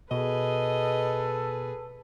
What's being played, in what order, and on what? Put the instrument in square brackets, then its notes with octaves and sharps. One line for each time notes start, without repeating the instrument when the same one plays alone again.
[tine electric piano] B2 [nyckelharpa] G#4 B4 [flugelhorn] A4 [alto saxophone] D#5